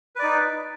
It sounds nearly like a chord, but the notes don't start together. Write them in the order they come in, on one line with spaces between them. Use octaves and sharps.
B4 D5 D#4